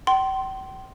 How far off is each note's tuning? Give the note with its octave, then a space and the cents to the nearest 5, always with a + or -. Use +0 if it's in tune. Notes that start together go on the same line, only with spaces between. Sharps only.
G5 -40 C6 +0